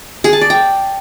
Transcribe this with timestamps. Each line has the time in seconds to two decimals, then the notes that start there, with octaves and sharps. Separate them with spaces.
0.24 G#4
0.33 A5
0.41 D5
0.50 G5